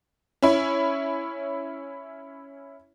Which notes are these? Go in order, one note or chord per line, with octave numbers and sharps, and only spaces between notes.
C#4 E4